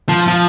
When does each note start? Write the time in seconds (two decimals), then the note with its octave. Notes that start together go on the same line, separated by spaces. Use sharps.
0.09 F3
0.28 F3